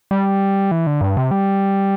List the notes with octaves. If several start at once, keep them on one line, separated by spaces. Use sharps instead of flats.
G3
E3
D3
G2
C3
G3